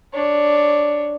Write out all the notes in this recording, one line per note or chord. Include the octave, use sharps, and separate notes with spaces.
D4 C#5